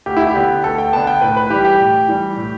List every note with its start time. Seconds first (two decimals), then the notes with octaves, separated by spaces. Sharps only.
0.06 D2 G4
0.17 E4
0.27 G4
0.35 D3 B3
0.64 D2 A4
0.78 G5
0.92 D3 B3 A5
1.07 G5
1.21 A2 B4
1.37 B4
1.50 E3 G3 G4
1.65 G4
1.80 A2
2.08 E3 G3
2.37 A2